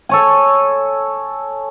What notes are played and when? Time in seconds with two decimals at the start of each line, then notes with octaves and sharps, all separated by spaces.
0.09 A4 C#5 G#5